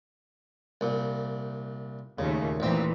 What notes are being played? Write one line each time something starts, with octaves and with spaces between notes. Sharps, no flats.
C2 A#2
D#2 A#2 C#3 A3
A1 E2 A#2 E3 C4